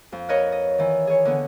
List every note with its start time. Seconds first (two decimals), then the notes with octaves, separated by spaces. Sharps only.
0.12 F2
0.29 A#4 B4 C#5 D#5
0.52 D#5
0.78 D#3 E3
1.07 G#4 C#5
1.25 D3 B3